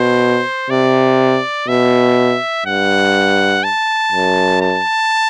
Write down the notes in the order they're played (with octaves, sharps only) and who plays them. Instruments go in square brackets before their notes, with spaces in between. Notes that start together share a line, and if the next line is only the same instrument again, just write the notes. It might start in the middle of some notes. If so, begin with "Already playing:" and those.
Already playing: [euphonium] B2 [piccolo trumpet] C5
[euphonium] C3 [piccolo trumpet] D5
[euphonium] B2 [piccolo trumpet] E5
[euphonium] G2 [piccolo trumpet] F#5
[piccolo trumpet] A5
[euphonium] F#2
[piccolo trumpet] A5